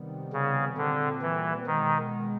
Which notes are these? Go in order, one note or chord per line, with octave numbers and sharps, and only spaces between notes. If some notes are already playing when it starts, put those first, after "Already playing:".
Already playing: C3 D#3 G3 B3
C#3
A#2 D3 G3 C4
E3
B2 D#3 G#3 B3